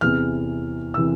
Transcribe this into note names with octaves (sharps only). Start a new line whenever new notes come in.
E2 C3 E3 F6
C3 E3 E6